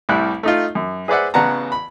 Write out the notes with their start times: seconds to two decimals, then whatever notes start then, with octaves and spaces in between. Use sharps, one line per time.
0.09 C2 A2 G3 E4 F#6
0.43 A3 D#4 F4
0.75 F#2
1.08 G#4 B4 C5 D5 E5 F#5
1.34 A1 C#3 B3 F#5 A5 A#5
1.72 B5